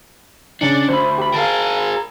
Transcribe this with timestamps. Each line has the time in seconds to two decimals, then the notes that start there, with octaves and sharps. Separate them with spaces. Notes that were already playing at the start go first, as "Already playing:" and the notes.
0.61 C#3 C#4 D4 C#7
0.89 D2 C5 B5
1.18 G4 B5
1.34 G#4 A#4 F5 A5